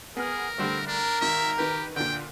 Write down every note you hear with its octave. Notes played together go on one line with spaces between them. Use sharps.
B3 G#4 A#4 F6
D3 G3 A3 C4
D4 A#4
G#1 D#3 E5
D#3 G4 B4
A#2 D3 G5